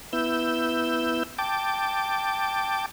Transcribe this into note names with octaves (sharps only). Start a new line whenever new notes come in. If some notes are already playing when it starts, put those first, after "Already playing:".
B3 E4 E6 G6
G5 A5 D6